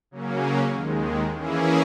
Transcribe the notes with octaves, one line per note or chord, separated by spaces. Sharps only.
C#3 F#3 A#3 C#4
D#2 D#3 G#3
E3 A#3 C#4 E4 G#4